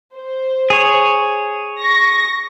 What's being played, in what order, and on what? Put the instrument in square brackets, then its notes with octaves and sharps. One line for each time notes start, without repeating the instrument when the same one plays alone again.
[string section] C5
[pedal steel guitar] G#4 C#5
[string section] C#6 A#6